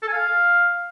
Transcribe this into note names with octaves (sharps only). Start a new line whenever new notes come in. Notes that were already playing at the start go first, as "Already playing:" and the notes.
A4
G#5
F5